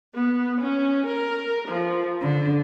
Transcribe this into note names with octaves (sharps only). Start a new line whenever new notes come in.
B3
C#4
A#4
F3
D3